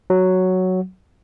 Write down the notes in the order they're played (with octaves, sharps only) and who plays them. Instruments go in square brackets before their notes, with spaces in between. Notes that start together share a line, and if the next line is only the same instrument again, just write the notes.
[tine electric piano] F#3